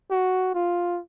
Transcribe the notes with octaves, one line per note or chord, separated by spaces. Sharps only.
F#4
F4